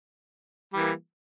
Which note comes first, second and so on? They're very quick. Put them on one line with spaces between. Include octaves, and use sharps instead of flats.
G3 E3 A#3